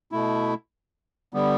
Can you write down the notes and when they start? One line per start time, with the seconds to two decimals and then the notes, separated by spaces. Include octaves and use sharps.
0.12 B2 A3 E4
1.34 D3 G3 B3